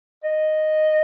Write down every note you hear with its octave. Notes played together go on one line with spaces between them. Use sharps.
D#5